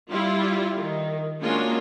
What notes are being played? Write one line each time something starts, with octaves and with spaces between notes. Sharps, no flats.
G3 E4 F4
D#3
G#3 A#3 C#4 D4 F4 F#4